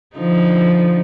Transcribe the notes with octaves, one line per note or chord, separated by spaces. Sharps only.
D3 F3 D#4